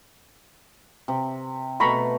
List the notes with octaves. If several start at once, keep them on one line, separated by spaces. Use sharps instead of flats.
C3
B2 A3 A4 A#5 B5 C#6